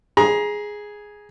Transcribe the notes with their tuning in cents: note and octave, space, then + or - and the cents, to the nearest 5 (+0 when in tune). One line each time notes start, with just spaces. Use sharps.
G#4 +0 A#5 +25